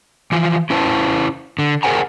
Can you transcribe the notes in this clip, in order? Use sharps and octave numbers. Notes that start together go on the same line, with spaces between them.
E3 F3
C#4 E4 B4 C5 A5
D3
G#4 A#4 C5 F#5 G#5 A#5